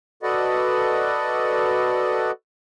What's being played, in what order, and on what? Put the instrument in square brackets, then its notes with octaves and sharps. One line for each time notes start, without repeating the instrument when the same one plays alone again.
[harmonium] F#4 A4 B4 D5 D#5 F#5